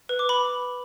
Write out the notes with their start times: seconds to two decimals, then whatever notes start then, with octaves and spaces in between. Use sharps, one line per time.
0.09 B4
0.19 D6
0.29 B5